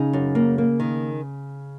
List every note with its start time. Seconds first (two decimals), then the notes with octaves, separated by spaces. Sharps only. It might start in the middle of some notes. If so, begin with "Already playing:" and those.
Already playing: C#3 D#4
0.13 F#2
0.35 A#3
0.58 A#3
0.80 D#3